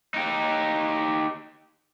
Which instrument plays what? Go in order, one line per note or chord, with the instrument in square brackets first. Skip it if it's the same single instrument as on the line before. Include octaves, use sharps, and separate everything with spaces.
[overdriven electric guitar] D#4 G4